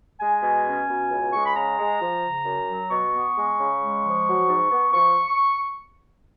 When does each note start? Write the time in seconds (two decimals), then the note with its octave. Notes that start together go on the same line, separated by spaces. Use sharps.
0.20 G#3 G#5
0.43 B2
0.65 C#4
0.88 B2
1.10 C#2
1.32 G#3 C#6
1.44 B5
1.55 C#3 A#5
1.78 G#3
2.01 F3
2.23 C#3
2.45 F#2
2.68 F#3
2.91 B2 C#6
3.13 B3
3.36 G#3
3.59 C#3
3.80 G#3
4.03 F3
4.26 F#3
4.49 G#2
4.71 B3
4.93 F3 C#6